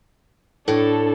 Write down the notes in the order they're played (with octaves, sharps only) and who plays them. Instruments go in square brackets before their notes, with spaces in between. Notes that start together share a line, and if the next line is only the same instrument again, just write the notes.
[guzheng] A2 [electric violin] D4 A4